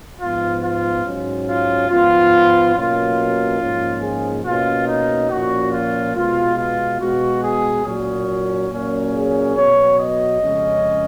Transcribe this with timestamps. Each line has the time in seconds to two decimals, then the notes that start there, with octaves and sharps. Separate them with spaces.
0.19 G#2 F3 B3 F4
0.62 F4
1.04 G#2 F#3 C#4
1.47 F4
1.89 G#2 F3 B3 F4
2.74 B2 F#3 A#3 C#4 F4
3.60 G#2 F3 A#3 C#4
4.02 G#4
4.44 B2 A#3 C#4 F4
4.87 D#4
5.30 A#2 F3 A#3 C#4 F#4
5.72 F4
6.15 B2 G#3 B3 F4
6.58 F4
7.00 B2 G#3 B3 F#4
7.42 G#4
7.85 A#2 F#3 C#4
8.70 A#2 F#3 A#3 C#4
9.13 G#4
9.55 B2 F#3 B3 C#5
9.98 D#5
10.41 F2 C#3 G#3 C#4